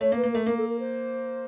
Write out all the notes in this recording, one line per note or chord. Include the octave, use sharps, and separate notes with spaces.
A3 C#5
A#3
B4
A#3
A3 A#4
A#3 A#4
A4
A#4
C5